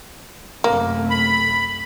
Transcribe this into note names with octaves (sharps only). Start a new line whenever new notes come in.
F#2 C3 A3 A#3
B5